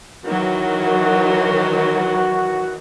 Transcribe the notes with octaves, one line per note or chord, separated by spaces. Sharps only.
D#3 E3 F#3 F#4